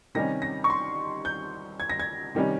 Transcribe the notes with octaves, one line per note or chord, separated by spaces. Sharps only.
C3 D#3 G3 C#4 A#6
A#6
C#6
C6
G6
G#6
A#6
G#6
C3 D#3 G3 C#4